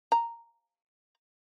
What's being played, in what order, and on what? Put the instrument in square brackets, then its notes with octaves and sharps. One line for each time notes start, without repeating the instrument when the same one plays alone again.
[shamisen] A#5